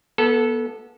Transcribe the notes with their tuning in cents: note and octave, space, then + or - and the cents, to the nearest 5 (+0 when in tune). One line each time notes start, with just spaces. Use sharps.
B3 -30 A4 -5